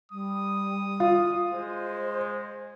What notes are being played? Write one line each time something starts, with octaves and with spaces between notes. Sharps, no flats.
G3 D#6
F4
G#3 C5